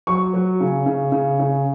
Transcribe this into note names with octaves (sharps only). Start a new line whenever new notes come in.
F#3 C#6
F#3
C#3
C#3
C#3
C#3